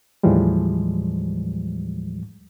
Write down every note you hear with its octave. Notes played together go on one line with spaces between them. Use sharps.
D#2 A2 E3 F3 G3 G#3